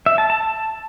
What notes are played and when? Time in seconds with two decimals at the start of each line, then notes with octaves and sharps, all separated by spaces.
0.06 E5
0.18 A5
0.30 A5